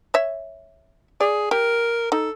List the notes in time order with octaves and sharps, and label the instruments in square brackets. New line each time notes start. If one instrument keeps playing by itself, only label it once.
[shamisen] C#5 E5
[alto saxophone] G#4 [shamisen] D5
[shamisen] G4 [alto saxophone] A#4
[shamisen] D#4 [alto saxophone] A4